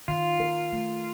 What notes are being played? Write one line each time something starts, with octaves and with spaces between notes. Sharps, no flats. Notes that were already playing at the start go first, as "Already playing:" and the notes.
D#3 F4
A#4
A3